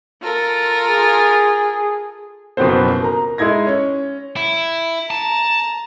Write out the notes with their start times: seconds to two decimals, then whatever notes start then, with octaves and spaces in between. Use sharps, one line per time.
0.21 F4 A4 A#4
0.89 G#4
2.57 F#1 B2 F3 B3 C4 C5
3.02 A#4 A#5
3.38 G#3 D#4 E4 G#6 A#6
3.67 C#4
4.36 E4
5.10 A5 A#5